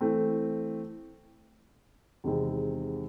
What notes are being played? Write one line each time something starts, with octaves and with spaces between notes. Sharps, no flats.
E3 A3 C4
E2 C3 D#3 G#3 C4